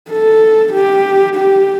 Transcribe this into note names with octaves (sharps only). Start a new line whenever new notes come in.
A4
G4
G4